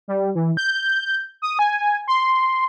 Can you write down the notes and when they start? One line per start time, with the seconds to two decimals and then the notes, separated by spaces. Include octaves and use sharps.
0.08 G3
0.35 E3
0.57 G6
1.42 D#6
1.59 G#5
2.08 C6